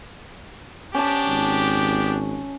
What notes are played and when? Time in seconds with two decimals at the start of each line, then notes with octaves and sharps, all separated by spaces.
0.94 B3 C#4 D4 G4 A5
1.27 G#1